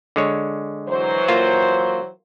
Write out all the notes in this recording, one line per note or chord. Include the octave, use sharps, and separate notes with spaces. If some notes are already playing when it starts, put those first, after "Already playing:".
D3 G#3 C#5
E3 F#3 C5
A#3 F4